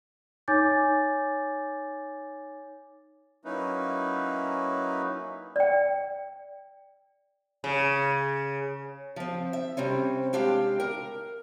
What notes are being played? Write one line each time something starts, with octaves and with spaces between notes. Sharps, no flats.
D#4 C#5 G#5 D6 G6 A6
F#3 A#3 C#4 D#4 E4 B4
D5 G5
C#3
F3 C4
E5
C3 G3 C4 C#4
G#3 D4 G4 F5 G5
A#4